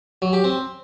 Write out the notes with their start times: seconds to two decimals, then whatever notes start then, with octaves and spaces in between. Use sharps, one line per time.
0.22 F#3
0.33 G4
0.44 C4